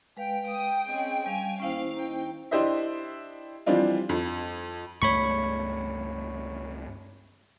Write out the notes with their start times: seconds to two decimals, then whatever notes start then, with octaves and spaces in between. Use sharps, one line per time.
0.17 G#3 B4 F5 G5
0.47 D#6
0.89 C4 C#4 G#4 D#5
1.26 G3 F5 G#5
1.60 D#2 C#4 E4 C5 F5
1.95 D#4 G5
2.51 D4 E4 G4 C5 D#5 E5
3.66 E3 F3 G3 C4 D4 F4
4.09 F2
5.02 C#2 G2 A3 C#5 B5 C#6